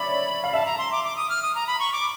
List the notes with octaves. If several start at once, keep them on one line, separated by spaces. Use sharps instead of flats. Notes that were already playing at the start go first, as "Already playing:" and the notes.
Already playing: C#5 D5 E5 B5
F5
E5 A5
A#5
C6
D6
D6
D#6
F6
D#6
A#5
B5
C#6
D6